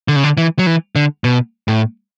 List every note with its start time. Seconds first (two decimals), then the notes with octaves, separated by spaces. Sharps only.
0.08 D3
0.16 C#3
0.23 D3
0.37 E3
0.59 F#3
0.67 E3
0.96 D3
1.24 B2
1.68 A2